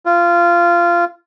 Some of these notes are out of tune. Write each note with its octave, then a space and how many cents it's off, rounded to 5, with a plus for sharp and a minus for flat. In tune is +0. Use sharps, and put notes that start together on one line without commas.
F4 -20